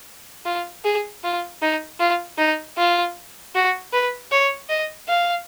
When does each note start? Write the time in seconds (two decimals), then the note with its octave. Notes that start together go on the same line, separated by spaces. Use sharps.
0.45 F4
0.84 G#4
1.23 F4
1.62 D#4
2.00 F4
2.38 D#4
2.77 F4
3.55 F#4
3.93 B4
4.32 C#5
4.69 D#5
5.08 F5